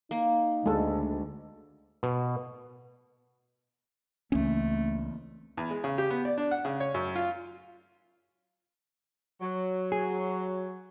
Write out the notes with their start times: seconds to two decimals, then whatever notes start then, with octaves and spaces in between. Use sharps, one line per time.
0.11 A#3 D#4
0.66 D2 G#3 A4
2.03 B2
4.32 C#2 E3 A3 A#3 C4 C#4
5.57 E2
5.71 G#3
5.84 C#3
5.98 G4
6.10 B3
6.25 D5
6.38 D4
6.51 F#5
6.65 C#3
6.80 C#5
6.94 F#2
7.16 F4
9.41 F#3
9.92 G#4